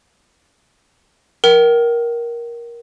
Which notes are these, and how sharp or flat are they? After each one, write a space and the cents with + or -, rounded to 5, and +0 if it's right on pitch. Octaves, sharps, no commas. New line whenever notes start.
A#4 +15 G5 -40